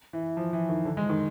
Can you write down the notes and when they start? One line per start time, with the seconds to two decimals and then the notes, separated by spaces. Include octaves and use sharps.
0.13 E3
0.37 F3
0.53 E3
0.69 D#3
0.85 D3
0.97 G#3
1.09 D#3